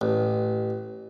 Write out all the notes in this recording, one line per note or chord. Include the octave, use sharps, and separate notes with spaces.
A1